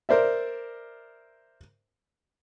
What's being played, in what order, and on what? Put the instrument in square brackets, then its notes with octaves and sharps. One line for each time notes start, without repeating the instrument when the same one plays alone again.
[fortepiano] A#4 C5 D5 E5